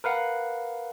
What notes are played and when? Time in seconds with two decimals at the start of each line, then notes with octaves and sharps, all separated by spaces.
0.04 A#4 B4 F5 F#5